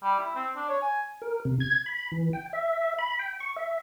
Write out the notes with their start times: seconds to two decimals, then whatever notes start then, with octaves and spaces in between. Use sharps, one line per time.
0.03 G3
0.19 E4
0.35 C4
0.56 D4
0.69 C#5
0.82 G#5
1.22 A#4
1.45 C3
1.60 G#6
1.86 B5
2.12 E3
2.33 G5
2.53 E5
2.99 B5
3.19 G5
3.40 C#6
3.56 E5